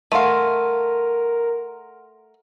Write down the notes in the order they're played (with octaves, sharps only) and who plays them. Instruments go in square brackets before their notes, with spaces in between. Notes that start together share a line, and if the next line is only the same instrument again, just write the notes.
[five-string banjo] A3 F5 [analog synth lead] A#4 [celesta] F#5 C6 D#7